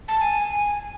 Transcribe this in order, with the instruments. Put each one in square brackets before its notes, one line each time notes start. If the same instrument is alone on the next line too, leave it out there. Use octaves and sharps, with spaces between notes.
[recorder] A5
G#5